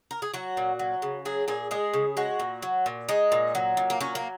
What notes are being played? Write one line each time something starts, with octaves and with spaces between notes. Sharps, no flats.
A#4
G#4
F#3 F#4
A#2
F#3
C#3
F#3 G#4
A#2 G#4
G#3 G#4
C#3
G#3 F#4
A#2
F#3
A#2
G#3 D#4
A#2
F#3
A#2
A#3
F#3 C#4
A#3